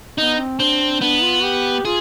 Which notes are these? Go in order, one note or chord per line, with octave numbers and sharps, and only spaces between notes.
B3 D#4
C4
C4 D4
B3 D4
F4
G4
F4 G#4